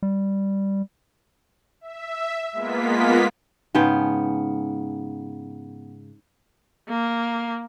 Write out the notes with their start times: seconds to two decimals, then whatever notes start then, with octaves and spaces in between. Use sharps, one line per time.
0.02 G3
1.81 E5
2.52 G#3 A#3 B3 F4 B6
3.75 G#2 C#3 B3 G5
6.89 A#3